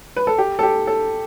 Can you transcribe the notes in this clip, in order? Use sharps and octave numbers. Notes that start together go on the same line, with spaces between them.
B4
A4
G4
A4
G4
A4